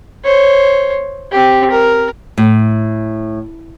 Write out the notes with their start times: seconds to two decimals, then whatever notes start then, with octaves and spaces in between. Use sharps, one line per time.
0.24 C5 C#5
1.32 C4 G4
1.71 A#4
2.38 A2